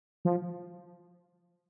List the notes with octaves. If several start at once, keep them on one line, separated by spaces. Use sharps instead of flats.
F3